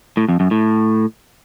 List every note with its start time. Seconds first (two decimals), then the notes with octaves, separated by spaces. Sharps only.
0.17 A2
0.29 F2
0.40 F#2
0.51 A2